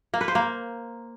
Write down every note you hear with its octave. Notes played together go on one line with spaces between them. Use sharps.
A#3
B4
C5
A#3